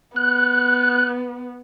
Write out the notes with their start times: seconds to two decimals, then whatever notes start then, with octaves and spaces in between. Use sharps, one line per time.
0.16 B3 F#6